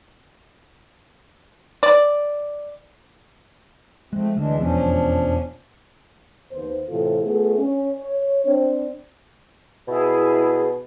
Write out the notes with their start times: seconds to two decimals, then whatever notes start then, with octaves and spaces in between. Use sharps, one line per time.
1.83 D5
4.13 F3 G#3 A3 C4
4.37 D2 E3 G#3 D4
4.60 E1 F2 F3 B3 C#4 D4
6.52 D#2 B3 C5
6.89 A2 C3 E3 E4 F4 A4
7.22 A3 B3 F4 G#4
7.58 C#4
7.98 C#5
8.46 C4 D4
9.88 B2 E4 G#4